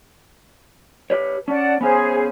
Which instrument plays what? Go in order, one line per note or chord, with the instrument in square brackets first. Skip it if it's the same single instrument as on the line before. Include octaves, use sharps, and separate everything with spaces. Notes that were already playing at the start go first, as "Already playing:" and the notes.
[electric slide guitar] G4 B4 C#5
[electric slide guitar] C#4 [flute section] D5 F#5 A5
[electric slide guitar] B3 C#4 F5 [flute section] G#4 C5 G#5